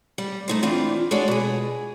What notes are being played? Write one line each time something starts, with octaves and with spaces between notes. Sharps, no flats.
G3
A3 D#4 C5
E3 C4 D4 F4
G#3 D4 F#4 A4 C#5 D5
B2 G#4